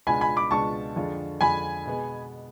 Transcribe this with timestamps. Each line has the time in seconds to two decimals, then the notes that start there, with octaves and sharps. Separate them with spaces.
0.07 C#2 B2 G#3 D4 F4 G#5 B5
0.21 G#5 B5
0.37 B5 D6
0.51 C#2 B2 G#3 D4 F4 A5 C#6
0.96 F2 D3 G#3 D4 F4
1.41 F2 D3 G#3 D4 F4 G#5 B5
1.85 B2 G#3 B3